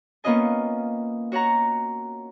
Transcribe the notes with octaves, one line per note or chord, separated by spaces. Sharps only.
A#3 B3 C#4 F4 D#5 G#5
F#4 C#5 F#5 A#5